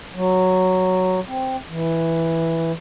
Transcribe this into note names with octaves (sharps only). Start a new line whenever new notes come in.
F#3
C4
E3